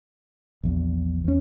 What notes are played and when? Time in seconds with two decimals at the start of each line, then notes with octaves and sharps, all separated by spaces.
0.63 A#1 E2
1.24 E2 C#4